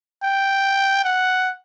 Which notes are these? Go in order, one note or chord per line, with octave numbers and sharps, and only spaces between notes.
G5
F#5